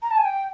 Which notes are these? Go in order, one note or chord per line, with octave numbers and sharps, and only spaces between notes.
A#5
A5
G#5
G5